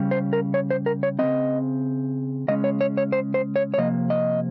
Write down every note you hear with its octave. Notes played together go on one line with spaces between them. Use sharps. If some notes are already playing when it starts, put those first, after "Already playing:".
Already playing: C#3 G3 C#4
C5
A#4
C#5
C5
A#4
C#5
C#3 G#3 C4 D#5
C#3 G#3 C#4 D#5
C#5
C#5
C#5
C5
C5
C#5
C#5
C3 F3 A#3 D#5
D#5